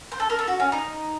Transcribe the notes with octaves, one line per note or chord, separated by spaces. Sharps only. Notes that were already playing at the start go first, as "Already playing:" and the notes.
C5
A4
A#4
A4
F#4
C#4
D#4